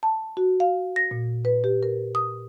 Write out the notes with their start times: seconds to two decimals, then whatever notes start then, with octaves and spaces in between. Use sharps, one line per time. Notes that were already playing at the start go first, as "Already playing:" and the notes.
0.03 A5
0.37 F#4
0.60 F5
0.96 A#6
1.11 A#2
1.45 B4
1.64 G4
1.83 A#4
2.15 D#6